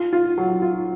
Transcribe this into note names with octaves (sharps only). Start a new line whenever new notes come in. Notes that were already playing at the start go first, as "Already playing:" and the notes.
Already playing: F4
F4
F#3
F4